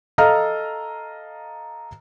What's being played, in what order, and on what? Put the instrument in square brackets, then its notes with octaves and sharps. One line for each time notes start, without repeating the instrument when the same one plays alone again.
[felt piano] A4 D#5 F5 A#5 F6